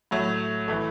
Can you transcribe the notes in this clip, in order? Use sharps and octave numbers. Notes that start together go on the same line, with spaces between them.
A2 F#3 A3
E3 A3